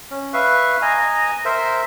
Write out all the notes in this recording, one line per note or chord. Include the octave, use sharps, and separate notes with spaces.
C#4
B4 E5 F5 C#6
D#5 G#5 A#5
A#4 C5 E5